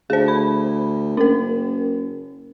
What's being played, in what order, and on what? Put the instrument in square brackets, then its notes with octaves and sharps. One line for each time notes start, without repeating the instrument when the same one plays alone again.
[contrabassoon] D2 [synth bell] G#4 C5
[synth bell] B5
[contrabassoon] F#1 [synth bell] C#4 A#4